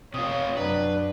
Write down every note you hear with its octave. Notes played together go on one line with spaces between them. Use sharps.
C3 F4 C#5 D#6
F#2 F#3 D4 B4